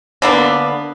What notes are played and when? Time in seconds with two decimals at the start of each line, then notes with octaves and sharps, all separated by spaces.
0.22 D3 A#3 B3